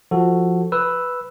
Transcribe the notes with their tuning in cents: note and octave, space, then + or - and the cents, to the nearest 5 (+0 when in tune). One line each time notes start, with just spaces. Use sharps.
F3 +0 F#4 +0 A4 +10
B4 +0 E6 +0